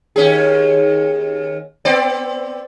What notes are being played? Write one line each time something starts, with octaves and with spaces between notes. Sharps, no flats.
D#2 C#4 G#4
B3 C4 D5